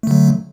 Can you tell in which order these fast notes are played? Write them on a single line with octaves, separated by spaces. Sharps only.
A3 D3 F#3